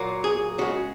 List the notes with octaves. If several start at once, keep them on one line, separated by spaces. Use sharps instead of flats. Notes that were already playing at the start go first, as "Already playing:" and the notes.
Already playing: A#2 F#3 A#3
G#4
C#3 G#3 F#4